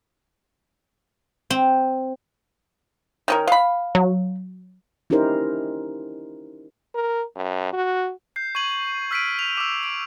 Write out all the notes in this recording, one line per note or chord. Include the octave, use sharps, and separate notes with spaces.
C4
D#3 C#4 A#4
F5 B5
F#3
C#4 D#4 E4 G4 A#4 C5
A#4
F#2
F#4
G6 C7
C#6 G#6 D#7 F#7
E6 F6 B6 C7 D7 D#7
F7
D6 E6
D7